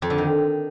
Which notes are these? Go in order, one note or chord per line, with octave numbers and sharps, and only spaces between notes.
F2
D3
D#3